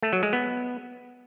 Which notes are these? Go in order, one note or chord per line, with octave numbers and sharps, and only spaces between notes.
A3
F#3
G#3
B3